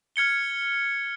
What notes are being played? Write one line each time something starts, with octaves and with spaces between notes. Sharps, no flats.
F6 G#6 C#7 G7